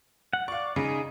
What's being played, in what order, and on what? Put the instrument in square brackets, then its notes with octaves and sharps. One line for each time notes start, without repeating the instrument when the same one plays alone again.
[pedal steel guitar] F#5
[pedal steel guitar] D5 [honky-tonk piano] F5 C#6
[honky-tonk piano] C#3 [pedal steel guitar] D#4 G#4